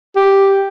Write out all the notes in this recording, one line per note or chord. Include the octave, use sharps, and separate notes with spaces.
G4